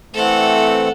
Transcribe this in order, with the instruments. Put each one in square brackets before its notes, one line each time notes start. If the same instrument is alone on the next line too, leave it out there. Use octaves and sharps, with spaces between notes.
[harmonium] E3 A3 C4 [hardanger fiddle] A4 F#5